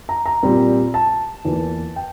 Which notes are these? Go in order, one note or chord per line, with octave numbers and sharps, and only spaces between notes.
A#5
A#5
A#2 G3 C4
A5
E2 E3 A#3
G5